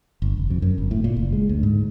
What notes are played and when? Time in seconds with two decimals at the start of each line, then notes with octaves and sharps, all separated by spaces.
0.22 G1
0.38 F1
0.50 F2
0.62 F#2
0.78 G1
0.91 A2
1.04 A#2
1.17 F#1
1.33 G#3
1.49 D2
1.63 G#2